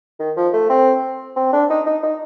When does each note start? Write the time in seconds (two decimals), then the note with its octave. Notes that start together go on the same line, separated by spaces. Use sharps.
0.19 D#3
0.36 F3
0.53 A3
0.69 C4
1.36 C4
1.53 D4
1.70 D#4
1.86 D#4
2.03 D#4